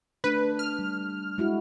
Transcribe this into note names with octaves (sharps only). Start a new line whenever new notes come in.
A3 D4 B4
F6
G3
G#3 E4 F#4